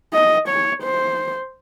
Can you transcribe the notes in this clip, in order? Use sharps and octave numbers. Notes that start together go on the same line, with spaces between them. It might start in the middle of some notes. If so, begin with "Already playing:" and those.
D#5
C#5
C5